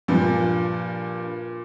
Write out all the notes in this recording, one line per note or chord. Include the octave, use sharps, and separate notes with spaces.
G2 A#2 F3